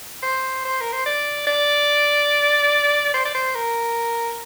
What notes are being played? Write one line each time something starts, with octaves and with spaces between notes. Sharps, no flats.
C5
C5
A#4
C5
D5
D5
C5
D5
C5
A#4